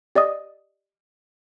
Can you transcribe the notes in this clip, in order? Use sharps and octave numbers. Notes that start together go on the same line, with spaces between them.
G4 D5 D#5 D#6